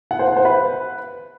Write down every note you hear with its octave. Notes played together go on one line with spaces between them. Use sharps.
F#5
C5
F#5
C5
B4